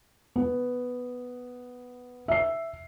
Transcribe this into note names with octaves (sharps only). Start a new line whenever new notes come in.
B3
E5 C7